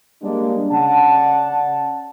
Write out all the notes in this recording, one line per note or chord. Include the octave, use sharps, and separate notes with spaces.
G3 G#3 A#3 D4
C#3 D5 F#5 A5